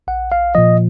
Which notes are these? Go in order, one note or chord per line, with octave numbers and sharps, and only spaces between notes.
A#1 F#5
F5
A#2 F3 D#5